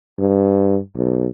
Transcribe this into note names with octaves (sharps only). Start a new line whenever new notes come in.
G2
B1